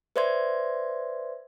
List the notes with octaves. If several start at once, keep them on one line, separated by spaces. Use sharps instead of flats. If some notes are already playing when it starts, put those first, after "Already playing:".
B4 C5 D5 E5 C6 G#6